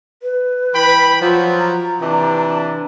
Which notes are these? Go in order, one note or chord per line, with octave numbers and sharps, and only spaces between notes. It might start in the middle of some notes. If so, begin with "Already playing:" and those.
B4
E3 G5 B5
F3 F#3 F4
A#5
C3 E3 D4